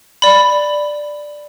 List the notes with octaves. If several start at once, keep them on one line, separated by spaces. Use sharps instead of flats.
D5 B5